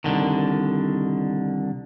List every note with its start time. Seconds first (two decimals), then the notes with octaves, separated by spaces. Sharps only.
0.04 C2 D3 D#3